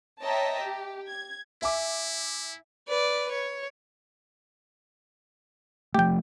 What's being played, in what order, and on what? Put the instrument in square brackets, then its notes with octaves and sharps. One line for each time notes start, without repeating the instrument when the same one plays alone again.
[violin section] C#5 D#5 E5 G5 A5 A#5
G4
G#6
[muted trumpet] E4 [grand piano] E5 G#5 D6
[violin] B4 D5
C#5
[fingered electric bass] F3 A3 [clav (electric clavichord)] G4 G5